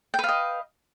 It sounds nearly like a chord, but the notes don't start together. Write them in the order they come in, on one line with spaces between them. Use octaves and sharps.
G5 B4 F5 D#5